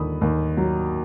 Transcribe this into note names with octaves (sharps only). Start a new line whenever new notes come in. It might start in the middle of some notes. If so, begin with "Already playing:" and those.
Already playing: D#2 D3 B5 D#6
D#2
F#3